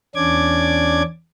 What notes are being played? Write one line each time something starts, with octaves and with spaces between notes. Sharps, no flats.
E2 C#4 D4 D5 D6 G#6